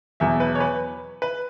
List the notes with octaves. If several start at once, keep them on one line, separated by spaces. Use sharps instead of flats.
E2 B2 F#3 E5
B4
C#5
B4
B4